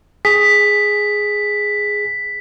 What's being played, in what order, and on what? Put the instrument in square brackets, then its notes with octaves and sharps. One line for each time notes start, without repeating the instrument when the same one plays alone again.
[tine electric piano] G#4 [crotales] B6